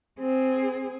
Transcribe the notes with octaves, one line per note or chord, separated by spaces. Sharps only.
C4 G#4